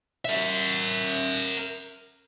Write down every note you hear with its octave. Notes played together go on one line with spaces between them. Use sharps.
A#4 E5